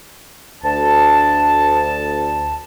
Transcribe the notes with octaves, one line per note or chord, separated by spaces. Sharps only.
D2 A5